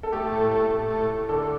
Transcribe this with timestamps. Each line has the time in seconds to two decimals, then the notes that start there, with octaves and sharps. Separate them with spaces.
0.03 A4
0.12 A3 G4
0.32 A2
0.51 A3
0.71 A3
0.90 A2
1.10 A2
1.29 D3 A4